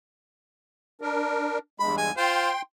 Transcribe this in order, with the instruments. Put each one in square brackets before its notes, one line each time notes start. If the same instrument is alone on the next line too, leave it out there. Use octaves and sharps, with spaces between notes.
[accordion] D4 A#4
[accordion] E2 G2 G#3 [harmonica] B5
[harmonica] G#5
[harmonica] F4 C5 [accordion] G5 C6